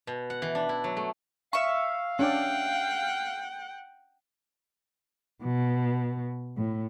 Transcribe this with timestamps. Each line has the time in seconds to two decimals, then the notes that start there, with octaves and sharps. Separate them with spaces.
0.07 B2
0.30 F#5
0.42 E3
0.55 D4
0.69 E4
0.84 F#3
0.97 A3
1.53 E5 F5 C#6
2.19 C#4 D4 D5 F#5 G5
5.44 B2
6.57 A2